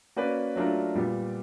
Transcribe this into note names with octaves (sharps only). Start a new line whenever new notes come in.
A#3 C#4 F#4 B4 D5
F#3 A3 D4 F4 A#4
A#2 G3 B3